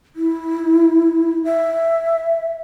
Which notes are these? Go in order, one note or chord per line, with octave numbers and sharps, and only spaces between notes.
E4
E5